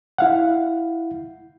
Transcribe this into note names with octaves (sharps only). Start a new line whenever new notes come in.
E4 F5 F#5